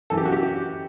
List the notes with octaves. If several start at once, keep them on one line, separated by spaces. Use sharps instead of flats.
F#2 E3 A4
G4
F#4
G4
G4